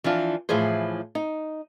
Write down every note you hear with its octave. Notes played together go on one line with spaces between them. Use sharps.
E3 F3 D4 F4
A2 E3 F3 G#4 C5
D#4